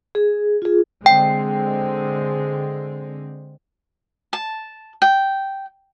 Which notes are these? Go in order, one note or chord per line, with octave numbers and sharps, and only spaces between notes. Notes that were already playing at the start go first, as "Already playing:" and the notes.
G#4
F4 G#4
D3 G#3 C4 G5
A5
G5